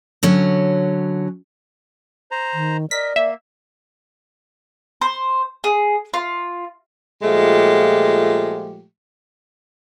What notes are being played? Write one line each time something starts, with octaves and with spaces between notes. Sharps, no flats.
D3 F#3 C#4
C5 A#5
D#3
A#4 D5 D#5 B6
A#3 E5
C5
G#4
F4
A#2 F3 G#3 A3 G4